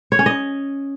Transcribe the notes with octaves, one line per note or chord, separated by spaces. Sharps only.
C#5
C#4
D#5